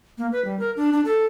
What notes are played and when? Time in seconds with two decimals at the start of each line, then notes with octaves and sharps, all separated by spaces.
0.18 A#3
0.32 B4
0.45 G3
0.59 A#4
0.77 D4
0.93 D4
1.05 A4